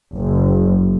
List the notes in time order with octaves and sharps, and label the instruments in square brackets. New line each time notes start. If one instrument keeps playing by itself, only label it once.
[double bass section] F#1